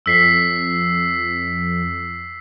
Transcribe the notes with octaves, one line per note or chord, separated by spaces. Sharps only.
F2 E6 B6 C7